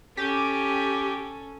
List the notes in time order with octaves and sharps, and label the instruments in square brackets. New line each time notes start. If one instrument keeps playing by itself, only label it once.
[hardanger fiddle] C#4 A4 [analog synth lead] G4